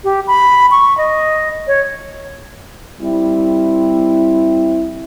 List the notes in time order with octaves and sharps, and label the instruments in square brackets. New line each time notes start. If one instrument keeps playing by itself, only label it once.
[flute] G4
B5
C#6
D#5
C#5
[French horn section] G3 C4 E4